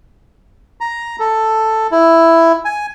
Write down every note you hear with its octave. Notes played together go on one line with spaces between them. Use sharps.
A#5
A4
E4
G#5